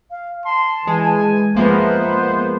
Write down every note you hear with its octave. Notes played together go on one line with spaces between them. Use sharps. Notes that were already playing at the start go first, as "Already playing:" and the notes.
F5
A5 C6
E3 G#3 G#5
F3 G#3 A#3 B3 C5 E5